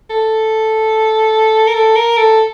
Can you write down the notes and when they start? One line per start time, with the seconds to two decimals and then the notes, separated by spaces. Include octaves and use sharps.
0.10 A4
1.67 A#4
1.74 A4
1.96 A#4
2.17 A4